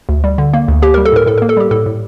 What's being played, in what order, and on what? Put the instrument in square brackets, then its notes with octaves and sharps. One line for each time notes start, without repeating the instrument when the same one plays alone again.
[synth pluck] D2
G3
D3
A#3
D2
A#3 G4
A#4
G3
A4
A2 A#4
A2 A4
A#4
A#3
A4
G3 G4
A2 A4
A2